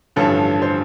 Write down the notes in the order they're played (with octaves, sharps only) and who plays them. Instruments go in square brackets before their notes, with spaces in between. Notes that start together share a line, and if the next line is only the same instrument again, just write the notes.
[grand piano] A1 G2 D3 F3 A4
C5